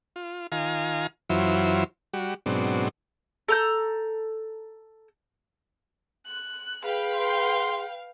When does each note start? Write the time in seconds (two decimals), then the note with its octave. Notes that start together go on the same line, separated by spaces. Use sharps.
0.16 F4
0.52 D#3 F4 F5 G#5 A#5
1.30 F#2 E3 F#3 E4 F4 C5
2.13 G3 F#4
2.46 G#2 B2 F#3 C4 D4
3.48 A4 A#5 G6
6.24 F#6
6.84 G#4 B4 F5 G5
7.15 C6